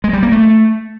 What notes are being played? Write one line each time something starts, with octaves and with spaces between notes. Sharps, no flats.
G#3
G3
A#3
A3